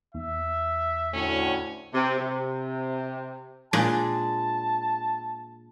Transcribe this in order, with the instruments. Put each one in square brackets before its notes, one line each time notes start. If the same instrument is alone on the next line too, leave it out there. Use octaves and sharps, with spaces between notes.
[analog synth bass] E2 [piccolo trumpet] E5
[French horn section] D2 A2 [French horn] C#4
[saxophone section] C3
C3
[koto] A#2 G#3 D4 [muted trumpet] A5